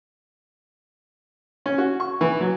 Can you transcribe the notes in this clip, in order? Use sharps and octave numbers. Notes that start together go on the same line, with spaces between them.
C#4
F#4
C#6
E3
F#3